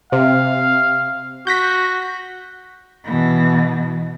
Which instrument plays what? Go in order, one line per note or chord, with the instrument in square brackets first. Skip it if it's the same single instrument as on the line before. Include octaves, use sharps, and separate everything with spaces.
[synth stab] C3 [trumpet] F5
[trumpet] F#4 [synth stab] G6 A#6 B6
[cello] B2 E3